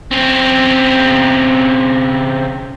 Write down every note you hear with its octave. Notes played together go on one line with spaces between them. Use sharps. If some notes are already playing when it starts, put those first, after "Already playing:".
C#3 C4